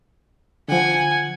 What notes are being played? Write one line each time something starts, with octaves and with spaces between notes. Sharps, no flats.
D3 F3 F#5 G#5